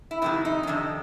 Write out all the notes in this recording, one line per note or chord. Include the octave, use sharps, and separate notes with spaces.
E4
F2 C3 D#3 E4
D#4
C#4
F2 C3 D#3 D4